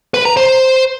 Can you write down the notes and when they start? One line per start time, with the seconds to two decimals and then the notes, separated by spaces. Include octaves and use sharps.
0.14 B4
0.25 A#5
0.37 C5